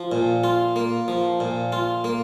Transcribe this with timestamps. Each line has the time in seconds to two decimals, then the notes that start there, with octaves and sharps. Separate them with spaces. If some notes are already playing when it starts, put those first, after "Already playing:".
Already playing: F3
0.12 A#2
0.44 F4
0.76 A#3
1.08 F3
1.40 A#2
1.72 F4
2.04 A#3